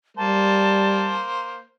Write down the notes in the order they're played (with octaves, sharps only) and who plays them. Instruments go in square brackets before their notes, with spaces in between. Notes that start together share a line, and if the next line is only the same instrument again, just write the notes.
[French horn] G3 [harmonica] A#3 C5 [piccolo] A5